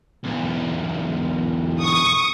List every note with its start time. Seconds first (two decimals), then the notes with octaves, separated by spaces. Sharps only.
0.24 B1 E2
1.81 C#6 D#6